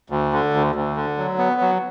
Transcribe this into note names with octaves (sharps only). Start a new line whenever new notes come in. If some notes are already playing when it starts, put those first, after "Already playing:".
D2
D3
D2
D2
D3
F#3
B3
F#3